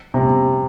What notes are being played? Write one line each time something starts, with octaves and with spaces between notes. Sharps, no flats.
C3